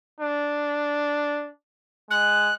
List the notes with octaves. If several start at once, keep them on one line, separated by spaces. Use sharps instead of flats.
D4
G#3 F#6